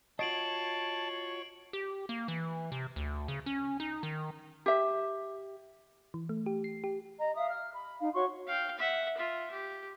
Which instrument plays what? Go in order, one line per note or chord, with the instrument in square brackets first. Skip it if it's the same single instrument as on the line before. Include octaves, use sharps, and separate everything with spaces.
[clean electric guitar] F4 F#4 D#5 [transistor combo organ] C#5 [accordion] A5 [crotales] C7 D7 F#7
[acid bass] G4
A#3
E3
C3
D2
C#3
C#4
D#4
D#3
[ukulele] G4 E5
[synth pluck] E3
A3
G4
C7
G4
[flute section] D#5 A#5
E5 F5 D#6
F6
B5
D#4 F5
F#4 C#5 C6 C#6
[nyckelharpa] F5 G5
E5 F#5
F4 E5
G4